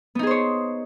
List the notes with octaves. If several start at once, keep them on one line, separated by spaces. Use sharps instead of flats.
B3 D#4 G#4 C5 C#5